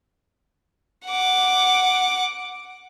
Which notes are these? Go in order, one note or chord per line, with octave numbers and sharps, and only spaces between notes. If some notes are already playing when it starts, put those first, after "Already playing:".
F#5 D6